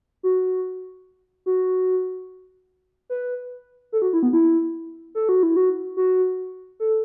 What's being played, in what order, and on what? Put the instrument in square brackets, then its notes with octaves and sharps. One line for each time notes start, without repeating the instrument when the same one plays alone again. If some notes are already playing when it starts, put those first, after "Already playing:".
[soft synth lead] F#4
F#4
B4
A4
F#4
E4
B3
E4
A4
F#4
E4
F#4
F#4
A4